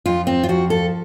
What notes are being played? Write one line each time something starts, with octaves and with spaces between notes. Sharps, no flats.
F2 F4
C4
F4
F3 F#4
A4